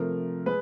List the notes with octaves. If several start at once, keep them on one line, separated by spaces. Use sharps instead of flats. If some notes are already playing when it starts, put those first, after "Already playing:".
Already playing: C3 F3 A3 A#4
G#3 B4